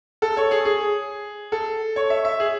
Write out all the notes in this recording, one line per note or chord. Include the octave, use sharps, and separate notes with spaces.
A4
C#5
G#4
G#4
A4
C#5
E5
E5
G#4